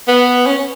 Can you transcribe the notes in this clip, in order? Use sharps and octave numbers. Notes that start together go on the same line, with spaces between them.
B3
C#4